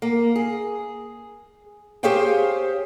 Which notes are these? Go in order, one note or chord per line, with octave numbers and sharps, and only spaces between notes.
A#3
G#4
G4 G#4 C5 C#5 F5 G5